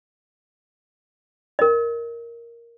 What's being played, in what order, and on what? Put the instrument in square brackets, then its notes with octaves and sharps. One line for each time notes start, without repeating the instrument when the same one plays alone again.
[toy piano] A#4 D#5